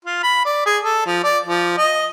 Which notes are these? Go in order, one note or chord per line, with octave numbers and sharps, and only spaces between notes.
F4
B5
D5
G#4
A4
F3
D5
F3
D#5